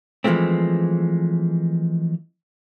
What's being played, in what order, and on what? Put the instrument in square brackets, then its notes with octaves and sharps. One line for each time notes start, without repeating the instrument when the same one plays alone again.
[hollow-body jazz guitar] E3 F3 G#3 A3 C4